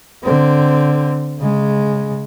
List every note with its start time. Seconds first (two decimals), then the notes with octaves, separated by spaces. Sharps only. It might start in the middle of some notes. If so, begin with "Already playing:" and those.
0.24 D3 C4
1.39 C#3 G#3